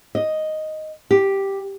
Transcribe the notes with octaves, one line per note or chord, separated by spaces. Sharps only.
D#5
G4